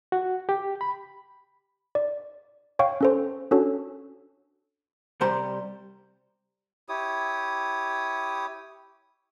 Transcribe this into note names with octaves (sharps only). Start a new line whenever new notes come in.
F#4
G4
B5
D5
C#5 F5 G5 C#6
C#4 A4 C5
C#4 D4 F#4 A4 C#5
C2 C3 G3 G4 C5 A#5
E4 G4 C#5 D#6